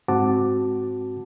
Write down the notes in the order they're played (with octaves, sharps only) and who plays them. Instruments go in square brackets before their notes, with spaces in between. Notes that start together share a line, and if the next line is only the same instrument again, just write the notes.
[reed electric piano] G#2 C4 F#4 F#5 A5 D6